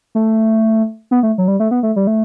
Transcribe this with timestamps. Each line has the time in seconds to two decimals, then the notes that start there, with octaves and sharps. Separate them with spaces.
0.15 A3
1.11 B3
1.23 A3
1.38 F#3
1.48 G3
1.60 A3
1.71 B3
1.83 A3
1.96 G3
2.07 A3